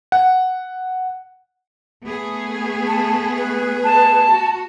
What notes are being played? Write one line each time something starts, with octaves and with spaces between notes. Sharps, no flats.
F#5
A3 B3 G#4
A5
B4
A5
F#4